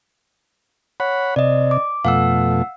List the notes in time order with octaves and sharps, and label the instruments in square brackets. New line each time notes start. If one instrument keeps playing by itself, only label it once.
[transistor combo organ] C#5 F#5 B5
[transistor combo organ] C3 [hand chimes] D5 D#5
[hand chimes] D6
[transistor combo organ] F2 B2 A3 [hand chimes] F5 F#5 E6